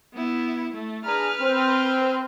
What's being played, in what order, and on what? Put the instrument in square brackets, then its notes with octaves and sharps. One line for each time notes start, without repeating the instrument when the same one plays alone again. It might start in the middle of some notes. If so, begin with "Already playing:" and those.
[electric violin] B3 E4
A3
[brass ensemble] D4 G#4 A#5 [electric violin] B4 F6
[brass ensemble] C4